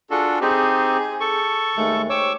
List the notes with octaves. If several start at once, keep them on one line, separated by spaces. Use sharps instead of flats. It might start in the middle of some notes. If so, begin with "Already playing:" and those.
D4 F4 F#4 G#4 A4
C4 D#4 G4 G#4
A4 C#6
D#2 G#3 A3
G4 C5 C#5 C#6 D6 E6